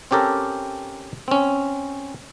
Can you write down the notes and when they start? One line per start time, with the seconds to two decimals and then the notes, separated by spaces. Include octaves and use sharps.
0.11 C4 C#4 G4 A4 A#4
1.28 C4 C#4